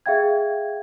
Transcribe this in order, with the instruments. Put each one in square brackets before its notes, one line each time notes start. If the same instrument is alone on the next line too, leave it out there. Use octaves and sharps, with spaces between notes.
[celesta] G#4 E5 F5 G5 G#6